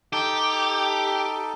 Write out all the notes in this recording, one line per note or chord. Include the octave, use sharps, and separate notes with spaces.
D#4 G4 A4